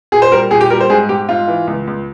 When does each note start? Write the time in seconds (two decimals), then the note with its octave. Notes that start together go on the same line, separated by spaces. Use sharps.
0.12 A#2 G#4
0.22 C5
0.32 G3 A#4
0.50 A#2 G#4
0.61 G4
0.70 G3 A#4
0.80 C5
0.90 G#2 G#4
1.09 G#2 G4
1.29 G#2 F4
1.48 E3
1.67 C#2
1.87 C#2